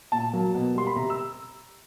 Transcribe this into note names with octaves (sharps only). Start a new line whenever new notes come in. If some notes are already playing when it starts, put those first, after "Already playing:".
A#2 A5
F#3 A#3
B2
G3 A#3 C6
B5
C3 A#5
E6